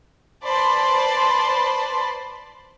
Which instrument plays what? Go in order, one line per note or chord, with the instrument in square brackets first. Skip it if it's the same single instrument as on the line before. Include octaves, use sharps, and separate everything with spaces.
[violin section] B4 C5 D5 A5 B5 C6